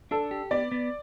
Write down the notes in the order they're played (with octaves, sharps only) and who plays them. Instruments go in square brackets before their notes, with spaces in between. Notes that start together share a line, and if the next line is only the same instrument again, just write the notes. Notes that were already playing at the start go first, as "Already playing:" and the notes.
[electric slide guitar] D4 [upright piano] A4
[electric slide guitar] G4
[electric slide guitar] B3 [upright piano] D5
[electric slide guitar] B3